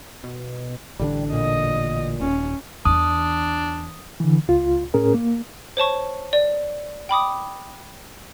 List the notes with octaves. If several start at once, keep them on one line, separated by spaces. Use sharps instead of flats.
B2
A1 D3 G3 D4
A#2 D#5
D#1 C#4
E2 E3 D4 D#6
D3 E3
C#2 F4
A2 C#4 G#4 A#4
A#3
C5 C#5 A5 C#6
D5
G5 B5 D6 D#6